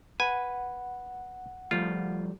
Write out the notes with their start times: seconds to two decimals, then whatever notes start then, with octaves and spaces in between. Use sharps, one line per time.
0.20 B4 F#5 G#5
1.71 F3 G3 A3 F4